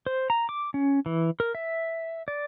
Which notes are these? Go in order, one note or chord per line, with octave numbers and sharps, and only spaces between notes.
C5
A#5
D6
C#4
E3
A#4
E5
D5